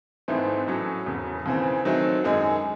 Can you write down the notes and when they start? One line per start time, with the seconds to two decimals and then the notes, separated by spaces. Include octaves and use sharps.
0.28 G#1 G#2 E3 A3 C4
0.67 A2 F#3 C#4
1.06 E1 E2 C#3
1.46 D#2 C#3 E3 C4
1.85 D#3 F#3 A3 C4
2.24 F#2 D#3 G#3 D#4 G#4